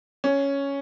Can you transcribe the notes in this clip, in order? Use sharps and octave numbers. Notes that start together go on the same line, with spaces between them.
C#4